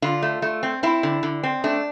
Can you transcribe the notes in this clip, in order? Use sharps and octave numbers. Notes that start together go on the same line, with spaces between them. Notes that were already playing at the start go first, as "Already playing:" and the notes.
D3 F4
A3
A3
C4
C4 E4
D3
D3
C4
A3 D4